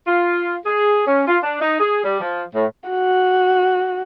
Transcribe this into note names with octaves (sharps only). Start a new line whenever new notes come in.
F4
G#4
C#4
F4
D4
D#4
G#4
G3
F3
A2
F#4